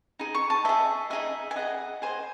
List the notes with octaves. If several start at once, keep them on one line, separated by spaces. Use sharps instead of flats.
D#4 G#4
C#6
A5
G#4 D#5 E5
D#4 G#4 D#5 E5
G#5
G#4 D#5 F#5
G#4 C5 D#5 G#5